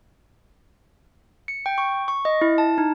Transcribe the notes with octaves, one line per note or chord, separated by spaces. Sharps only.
C#7
G5
C#6
C#6
D#5
E4
A5
D#4